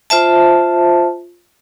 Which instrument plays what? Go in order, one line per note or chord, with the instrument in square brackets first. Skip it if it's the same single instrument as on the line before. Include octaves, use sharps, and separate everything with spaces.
[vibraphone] F4 C5 E5 A5